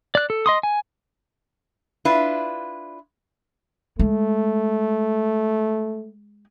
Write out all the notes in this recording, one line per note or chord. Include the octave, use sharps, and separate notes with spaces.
D5 F#6
A4
D#5 C6 D#6
G#5
D4 E4 F4 B4
G#3 A3